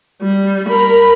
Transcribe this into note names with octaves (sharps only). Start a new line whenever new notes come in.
G3
A#4 B5